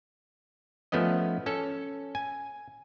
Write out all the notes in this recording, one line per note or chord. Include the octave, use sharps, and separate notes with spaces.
F3 A3 B3 C#4 D#5
C#4 A4
G#5